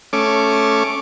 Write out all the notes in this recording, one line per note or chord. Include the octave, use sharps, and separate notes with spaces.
A3 C#4 D6